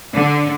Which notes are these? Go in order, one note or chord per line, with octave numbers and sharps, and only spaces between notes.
D3